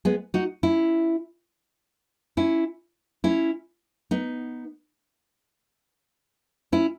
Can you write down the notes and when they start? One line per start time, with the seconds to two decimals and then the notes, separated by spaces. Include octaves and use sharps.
0.05 G#3 B3
0.34 D#4 F#4
0.63 C#4 E4
2.37 C#4 E4
3.24 C#4 E4
4.11 B3 D#4
6.72 C#4 E4